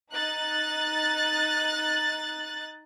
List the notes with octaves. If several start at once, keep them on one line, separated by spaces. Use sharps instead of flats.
D#4 F#6 A6